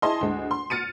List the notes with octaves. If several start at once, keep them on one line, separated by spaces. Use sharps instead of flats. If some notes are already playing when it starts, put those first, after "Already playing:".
E4 G#4 D#5 A5 C6
D2 G#3
C6
F6 A6 C#7 D#7